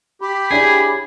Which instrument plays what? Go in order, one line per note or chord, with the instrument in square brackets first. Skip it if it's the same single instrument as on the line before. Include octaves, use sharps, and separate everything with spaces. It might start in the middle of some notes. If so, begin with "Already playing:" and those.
[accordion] G4 [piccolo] B5
[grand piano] D4 E4 C#5 [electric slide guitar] G#4